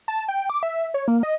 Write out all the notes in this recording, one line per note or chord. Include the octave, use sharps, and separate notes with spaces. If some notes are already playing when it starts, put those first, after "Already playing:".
A5
G5
D6
E5
C#5
A#3
D#5